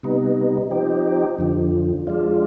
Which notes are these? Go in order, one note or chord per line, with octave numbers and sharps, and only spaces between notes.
C3 G3 B3 D#4
F3 C4 D#4 G4
F2 D3 F3
F3 G#3 D4 F4